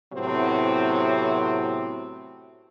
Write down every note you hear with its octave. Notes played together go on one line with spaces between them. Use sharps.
A2 C3 F#3 B3 C4 F#4